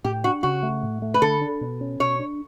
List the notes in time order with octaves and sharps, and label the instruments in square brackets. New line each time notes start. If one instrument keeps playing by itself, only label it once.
[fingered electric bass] A2 [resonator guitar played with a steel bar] G4
[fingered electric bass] D4 [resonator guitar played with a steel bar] F#4
[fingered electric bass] C#3 [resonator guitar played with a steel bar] F#4
[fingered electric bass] A3
A2
A3
[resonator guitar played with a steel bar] B4
[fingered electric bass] D3 [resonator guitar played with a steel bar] A4
[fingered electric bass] D4
B2
C#4
[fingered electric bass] B2 [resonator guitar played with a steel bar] C#5
[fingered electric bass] D4